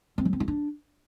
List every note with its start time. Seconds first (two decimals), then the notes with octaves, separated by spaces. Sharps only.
0.18 C4
0.25 F#3
0.33 C4
0.40 F4
0.48 D4